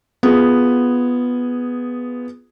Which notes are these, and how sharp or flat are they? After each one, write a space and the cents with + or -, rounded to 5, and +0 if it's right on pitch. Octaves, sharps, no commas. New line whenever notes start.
B3 +0 F4 +0 G#4 +0